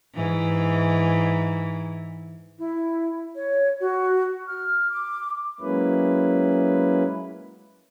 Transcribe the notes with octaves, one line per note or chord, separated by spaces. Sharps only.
G#2 E3
E4
C#5
F#4
F6
D6
F#3 G#3 A#3 C#4 E4 B4